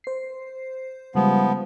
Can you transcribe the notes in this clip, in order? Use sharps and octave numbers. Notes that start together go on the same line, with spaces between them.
C5 C7
C#3 F3 G3 G#3 B3